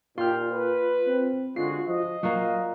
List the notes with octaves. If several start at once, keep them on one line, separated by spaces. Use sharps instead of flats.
A#2 D#4 F4 G4 G5 C6 F6
B4
C4
D3 G#3 F4 F#4 C7
F3 D#5
A#2 F#3 A#3 F4 F#4